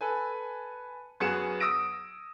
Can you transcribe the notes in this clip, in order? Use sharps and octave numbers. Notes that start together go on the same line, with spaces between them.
A4 B4 G#5
F#2 B3 F#4 G#4 C#7 E7
D#6 E6 A#6 D7